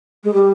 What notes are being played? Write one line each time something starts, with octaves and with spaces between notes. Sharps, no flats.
G#3
G3